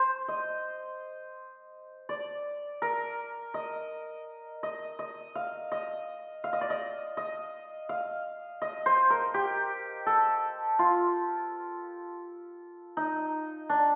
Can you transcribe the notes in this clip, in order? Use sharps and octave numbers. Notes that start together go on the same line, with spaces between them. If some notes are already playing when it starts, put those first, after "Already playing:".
Already playing: C5
D#5
D5
A#4
D#5
D#5
D#5
F5
D#5
F5
D#5
D5
D#5
D#5
F5
D#5
C5
A#4
G4
A4
F4
D#4
D4